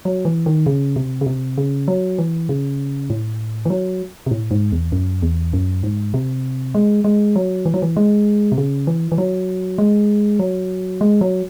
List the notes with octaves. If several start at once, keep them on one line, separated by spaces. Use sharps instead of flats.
F#3
E3
D#3
C#3
C3
C#3
C3
C#3
F#3
E3
C#3
A2
E3
F#3
C3
A2
G#2
E2
F#2
E2
F#2
G#2
C3
G#3
G#3
F#3
E3
F#3
E3
G#3
C3
C#3
E3
E3
F#3
G#3
F#3
G#3
F#3